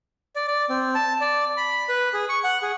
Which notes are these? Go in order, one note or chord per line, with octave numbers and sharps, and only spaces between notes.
D5
D5
C4
A5
D5
B5
B4
G#4
C#6
F#5
G#4